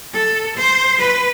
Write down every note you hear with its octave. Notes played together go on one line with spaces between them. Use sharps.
A4
C5
B4